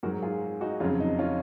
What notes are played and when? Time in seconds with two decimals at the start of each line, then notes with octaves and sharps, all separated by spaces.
0.03 G#2 F#3 F#4 A#4
0.22 F4 G#4
0.61 D#4 F#4
0.80 F2 C#3 F#3 C#4 F4
1.00 D#4
1.19 C#4 F4